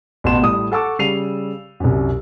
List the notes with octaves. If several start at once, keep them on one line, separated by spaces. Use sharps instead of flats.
A1 B2 B3 A5 C6 E7
A2 G3 D#6
A4 F#5 A5 C#6 D6 E6
C#3 G3 C7 D#7 F7
C2 F#2